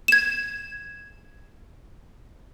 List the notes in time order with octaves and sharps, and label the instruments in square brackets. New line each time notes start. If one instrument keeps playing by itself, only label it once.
[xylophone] G#6 E7